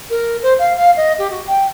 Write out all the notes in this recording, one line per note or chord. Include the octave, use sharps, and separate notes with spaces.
A#4
C5
F5
F5
D#5
G4
F#4
G5